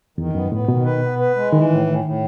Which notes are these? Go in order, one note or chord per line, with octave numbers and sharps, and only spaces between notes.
E2 D#3
F#2 B3
A2 B3
B2 D#3
B4
B3
B4
G#3
D#3 E3
A2
A2
A2